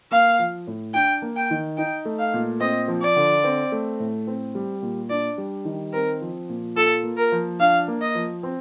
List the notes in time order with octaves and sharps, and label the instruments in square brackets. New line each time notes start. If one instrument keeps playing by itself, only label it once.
[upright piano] A#3 [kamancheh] F5
[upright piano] F3
A2
[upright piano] D4 [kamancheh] G5
[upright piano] A#3
[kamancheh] G5
[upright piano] D#3
[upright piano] D#4 [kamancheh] G5
[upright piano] A3
[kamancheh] F5
[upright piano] A#2
[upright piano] C4 [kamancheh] D#5
[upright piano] F3
[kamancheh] D5
[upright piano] D3
C4
A3
A2
C4
G3
A#2
[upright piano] D4 [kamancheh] D5
[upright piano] G3
D#3
[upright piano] C4 [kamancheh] A#4
[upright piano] F3
A#2
[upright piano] F4 [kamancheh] A4
[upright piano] A#3
[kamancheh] A#4
[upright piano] F3
[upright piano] D4 [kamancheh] F5
[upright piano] A#3
[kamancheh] D#5
[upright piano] F3
C4